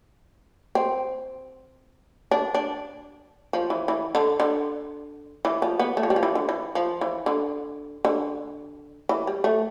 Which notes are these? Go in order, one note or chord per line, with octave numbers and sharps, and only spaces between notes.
C4
D4
D4
F3
E3
E3
D3
D3
E3
F3
B3
A3
F3
G3
F3
E3
D3
E3
F3
E3
D3
D3
E3
G3
A3